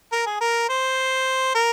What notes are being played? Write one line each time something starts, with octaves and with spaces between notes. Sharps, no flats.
A#4
G#4
A#4
C5
A#4